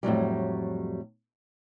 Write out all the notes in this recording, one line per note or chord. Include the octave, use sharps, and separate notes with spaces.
F2 A2 F#3 G3